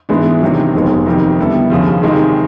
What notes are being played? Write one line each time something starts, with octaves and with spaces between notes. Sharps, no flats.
G#2 E3 G#3 B3 D4
C3 D#3 F#3
F1 D#2 D#3 G#3 B3
F2 C3 D#3
D3 G3 B3 E4 A4
D#2 C#3 F3
C3 D#3 G#3